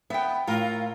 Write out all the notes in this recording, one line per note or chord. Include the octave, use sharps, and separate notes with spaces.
B3 E5 G5
A2 F4 A#4